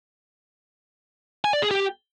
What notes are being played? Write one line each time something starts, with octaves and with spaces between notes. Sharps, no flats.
G#5
D5
G#4
G4